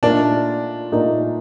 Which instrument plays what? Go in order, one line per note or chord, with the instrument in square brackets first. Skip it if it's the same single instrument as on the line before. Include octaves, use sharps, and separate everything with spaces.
[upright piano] A#2 A3 D#4 A#4 D5 [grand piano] D4
[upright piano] A#2 A3 D#4 A#4 D5